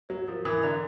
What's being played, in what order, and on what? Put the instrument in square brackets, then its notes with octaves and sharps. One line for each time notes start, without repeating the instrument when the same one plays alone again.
[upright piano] F#3 [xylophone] C#5
[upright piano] F3 [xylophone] A#4
[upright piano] E3 [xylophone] A#4
[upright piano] D3 [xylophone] A#5